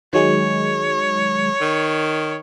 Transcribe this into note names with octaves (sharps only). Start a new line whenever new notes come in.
D#3 F#3 G#3 C#5
D#3